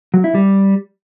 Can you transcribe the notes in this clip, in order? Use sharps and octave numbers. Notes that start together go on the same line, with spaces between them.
F#3
E4
G3